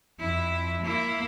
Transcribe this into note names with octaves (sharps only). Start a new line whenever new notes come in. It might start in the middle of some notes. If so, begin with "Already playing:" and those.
F2 E4
A#3 E4